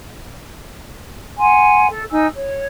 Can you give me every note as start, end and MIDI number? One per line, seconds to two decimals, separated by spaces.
1.38 1.87 78
1.38 1.87 80
1.38 1.87 84
1.89 2.03 69
2.10 2.27 63
2.10 2.27 80
2.10 2.27 88
2.34 2.67 73